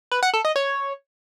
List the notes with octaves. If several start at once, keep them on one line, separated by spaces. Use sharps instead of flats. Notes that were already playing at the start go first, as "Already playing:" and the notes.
B4
F#5
A4
D#5
C#5